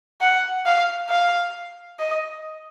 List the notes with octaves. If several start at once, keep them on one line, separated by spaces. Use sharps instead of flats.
F#5
F5
F5
D#5